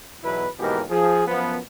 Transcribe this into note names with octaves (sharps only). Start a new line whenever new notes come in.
B1 E2 B2 F#3 E4 B4
D#2 G#2 B2 E3 G4 A#4
F3 G#4
F#2 F3 B3